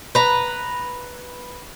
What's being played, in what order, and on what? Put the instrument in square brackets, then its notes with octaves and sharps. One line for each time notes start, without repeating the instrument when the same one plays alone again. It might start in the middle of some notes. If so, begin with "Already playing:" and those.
[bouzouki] B4 A#5